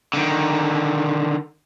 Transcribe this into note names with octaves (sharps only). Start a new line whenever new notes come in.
D3 D#3